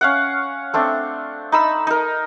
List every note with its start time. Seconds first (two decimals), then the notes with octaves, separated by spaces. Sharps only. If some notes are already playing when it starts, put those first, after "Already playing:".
0.01 C#4 F5 F#5
0.74 A3 C4 D4
1.52 D#4 B5 E6
1.87 D#4 A#4